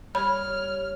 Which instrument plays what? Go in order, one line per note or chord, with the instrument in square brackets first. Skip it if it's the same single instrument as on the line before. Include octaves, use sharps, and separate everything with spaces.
[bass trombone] G3 [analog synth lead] C#5 [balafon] B5 [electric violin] F6